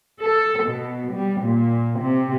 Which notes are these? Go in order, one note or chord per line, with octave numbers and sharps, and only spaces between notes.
A4
B2
G3
A#2
C3